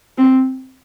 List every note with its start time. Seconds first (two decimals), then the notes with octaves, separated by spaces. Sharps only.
0.18 C4